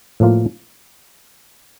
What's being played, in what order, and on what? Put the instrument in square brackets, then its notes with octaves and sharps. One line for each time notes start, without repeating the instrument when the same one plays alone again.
[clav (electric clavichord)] A2 F3 A#3 F4